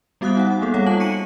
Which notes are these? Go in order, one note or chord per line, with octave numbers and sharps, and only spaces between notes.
G3 B3 F#4 F5 D#6 F#6
D#4 F#5
A#3 B3 G#4 A4
G3 A4 C#5 F5 F#5
D#4 F4 A5 F#7
C#6 C#7 D#7